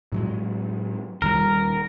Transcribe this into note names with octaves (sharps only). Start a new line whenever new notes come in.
A2 F#3 G#3
D#1 D#3 G3 A#4